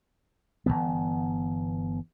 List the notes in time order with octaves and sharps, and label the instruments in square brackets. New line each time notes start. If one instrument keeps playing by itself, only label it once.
[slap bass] G1 F2 E3 B3